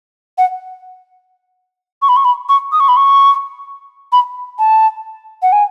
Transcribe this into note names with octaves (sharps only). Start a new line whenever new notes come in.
F#5
C#6
B5
C#6
B5
C#6
D#6
C#6
B5
C#6
B5
A5
F#5
G#5